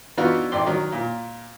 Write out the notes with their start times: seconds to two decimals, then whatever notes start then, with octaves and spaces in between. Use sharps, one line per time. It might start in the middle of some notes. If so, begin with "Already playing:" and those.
0.17 E3 B3 D4 D#4 F4 F#4
0.52 A1 D5 G5 C6
0.66 D#3 F#3
0.92 A#2